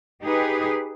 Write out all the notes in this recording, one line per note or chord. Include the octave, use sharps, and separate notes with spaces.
D#4 G4 G#4 B4